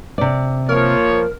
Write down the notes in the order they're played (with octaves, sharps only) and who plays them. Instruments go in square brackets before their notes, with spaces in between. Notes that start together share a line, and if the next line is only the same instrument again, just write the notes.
[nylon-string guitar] C3 D5
[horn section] F3 A#3 C#5 [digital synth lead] A#4